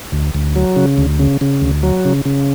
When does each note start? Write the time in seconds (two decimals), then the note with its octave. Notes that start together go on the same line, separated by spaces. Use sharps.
0.12 D2
0.35 D2
0.56 F#3
0.76 C#3
0.98 D2
1.19 C#3
1.41 C#3
1.62 D2
1.83 F#3
2.05 C#3
2.25 C#3